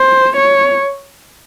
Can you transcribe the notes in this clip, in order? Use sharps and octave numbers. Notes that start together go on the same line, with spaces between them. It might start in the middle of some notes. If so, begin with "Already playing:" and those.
Already playing: C5
C#5